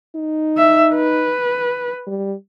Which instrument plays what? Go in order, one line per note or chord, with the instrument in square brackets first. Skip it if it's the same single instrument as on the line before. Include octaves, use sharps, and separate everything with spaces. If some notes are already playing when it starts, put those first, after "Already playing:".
[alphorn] D#4
[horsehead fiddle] E5
B4
[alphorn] G3